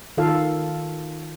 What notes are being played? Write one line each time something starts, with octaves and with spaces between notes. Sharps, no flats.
D#3 F4 A4 F5